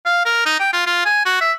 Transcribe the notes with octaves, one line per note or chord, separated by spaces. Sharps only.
F5
A#4
D#4
G5
F4
F4
G#5
F#4
E5